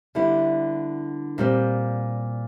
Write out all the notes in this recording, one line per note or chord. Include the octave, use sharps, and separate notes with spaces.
D3 G3 B3 E4
A#2 G3 C4